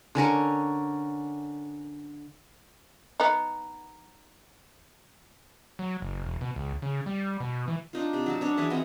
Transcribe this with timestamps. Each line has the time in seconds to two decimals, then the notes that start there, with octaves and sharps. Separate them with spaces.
0.15 D3 C#4 A#4 C#6
3.20 B3 D#4
5.79 F#3
6.02 F#1
6.23 E1
6.41 B2
6.56 C#2
6.82 C#3
7.06 G3
7.40 B2
7.68 E3
7.93 D4 D#4 F4
8.13 C3
8.26 F#3 F#4 A5
8.41 C#4 D4 C#5
8.57 E3 E4 G#4 C#5
8.70 B3 C4 D#5